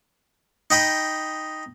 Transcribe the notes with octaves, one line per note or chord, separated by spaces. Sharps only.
D#4 G5 B5 D#6